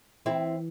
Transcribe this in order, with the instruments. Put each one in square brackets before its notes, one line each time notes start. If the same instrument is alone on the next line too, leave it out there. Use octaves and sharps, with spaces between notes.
[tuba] E3 [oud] C4 E4